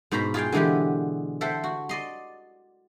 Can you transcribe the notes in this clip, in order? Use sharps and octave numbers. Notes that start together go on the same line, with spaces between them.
G#2 B2 C5 A#5 B5
F4 G#4 F5 G5
D3 E3 G#3 B3 G4
A4 C5 E5 F#5 G5
F#4
D5 D#5 C6